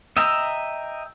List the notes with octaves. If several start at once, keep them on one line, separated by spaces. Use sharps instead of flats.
D#5 E5 G5 A#5